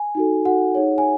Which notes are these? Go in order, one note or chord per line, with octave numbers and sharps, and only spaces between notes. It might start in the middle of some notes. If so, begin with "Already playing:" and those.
Already playing: G#5
D#4 F#4 A4
D#4 F#4 A4 F#5
D#4 G#4 C#5
G#5